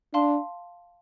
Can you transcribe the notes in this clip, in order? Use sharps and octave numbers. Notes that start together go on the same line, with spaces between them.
D4 F5 A5 C6